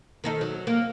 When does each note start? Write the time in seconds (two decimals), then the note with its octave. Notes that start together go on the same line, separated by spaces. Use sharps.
0.24 D#3 D#4 A4
0.41 F#3
0.67 A#3